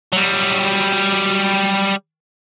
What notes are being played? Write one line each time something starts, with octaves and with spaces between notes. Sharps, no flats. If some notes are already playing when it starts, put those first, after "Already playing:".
F#3 G3